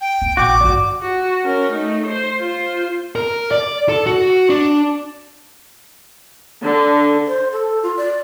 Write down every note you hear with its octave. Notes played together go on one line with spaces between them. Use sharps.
G5
C#4
A#1 F#4 G5 C#6 D6
G2 D3 F#4 D5
F#4
C#4 A#4
A3 D#4
C5
F4 C5
A#4
D5
A4
F#4
D4
D3
C5
A4
F4
D5